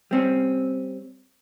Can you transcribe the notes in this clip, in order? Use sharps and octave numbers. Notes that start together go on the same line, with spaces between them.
G3 C4 C#4